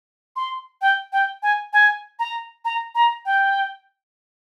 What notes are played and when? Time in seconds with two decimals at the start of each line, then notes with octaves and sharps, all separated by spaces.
0.36 C6
0.81 G5
1.12 G5
1.42 G#5
1.73 G#5
2.19 A#5
2.65 A#5
2.95 A#5
3.25 G5